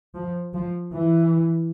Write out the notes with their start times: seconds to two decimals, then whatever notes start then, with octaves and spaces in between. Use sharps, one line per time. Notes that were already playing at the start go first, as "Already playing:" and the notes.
0.14 F3
0.54 F3
0.93 E3